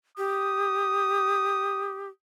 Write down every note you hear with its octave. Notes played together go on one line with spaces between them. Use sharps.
G4 D#6